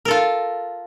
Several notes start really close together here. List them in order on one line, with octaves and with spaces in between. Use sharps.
A#4 A4 F4